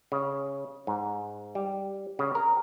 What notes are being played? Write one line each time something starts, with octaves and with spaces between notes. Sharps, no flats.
C#3
G#2
G3
C#3
A#4